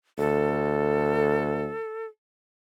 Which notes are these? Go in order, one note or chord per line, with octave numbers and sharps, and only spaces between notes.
D2 A4